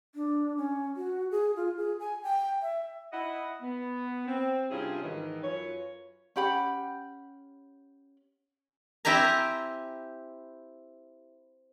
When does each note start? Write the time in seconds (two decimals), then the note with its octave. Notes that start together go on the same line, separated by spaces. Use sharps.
0.15 D4
0.57 C#4
0.96 F#4
1.31 G#4
1.56 F4
1.77 G#4
2.00 G#5
2.23 G5
2.62 E5
3.12 E4 D#5 F#5
3.62 B3
4.27 C4
4.70 G2 C3 C#4 E4 F4 G#4
5.02 G#2 D#3 E3
5.42 F#2 F4 B4 C#5
6.36 C#4 G4 F#5 B5
9.05 C4 E4 G4 G#5 A#5